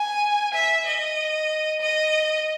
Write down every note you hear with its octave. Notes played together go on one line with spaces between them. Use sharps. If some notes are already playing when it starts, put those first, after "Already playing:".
Already playing: G#5
E5
D#5
D#5